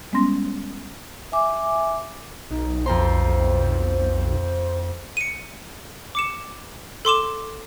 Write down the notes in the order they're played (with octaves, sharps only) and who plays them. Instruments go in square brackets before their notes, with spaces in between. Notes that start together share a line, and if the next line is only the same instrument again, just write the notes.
[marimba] G3 G#3 B3 C#4 C6 A#6
[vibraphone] E5 G#5 D6
[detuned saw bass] B1 [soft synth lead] D#4
[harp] F2 A#5 C6 [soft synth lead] C5
[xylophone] C#7 D#7
D6 C#7 E7
A4 C6 D6 E7